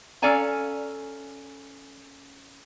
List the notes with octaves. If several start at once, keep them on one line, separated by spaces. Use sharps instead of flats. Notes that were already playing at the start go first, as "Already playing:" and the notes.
C#4 A4 D5 F5 G#5 A#5